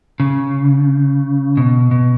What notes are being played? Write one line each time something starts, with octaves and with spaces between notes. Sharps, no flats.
C#3
B2
B2